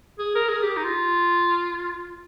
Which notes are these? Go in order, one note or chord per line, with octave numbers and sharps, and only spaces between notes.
G#4
A#4
G#4
G4
D#4
F4